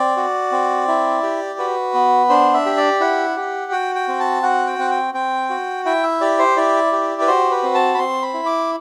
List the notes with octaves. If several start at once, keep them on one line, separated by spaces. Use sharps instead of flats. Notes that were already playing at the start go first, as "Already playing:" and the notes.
Already playing: C4 D5
F#4
C4
E4
G4
F#4 B4
B3
D4 C5
E5
G4
D5
E4 F#5
G4
F#4 G5
G5
C4
A5
F#4 F#5
G5
C4 F#5
G5
C4 G5
F#4
E4 G5
E5
G4 D5
C5
E4 D5
G4
B4
F#4 C5
B4
C4
A5
B5
C4 C6
B5
E4
D6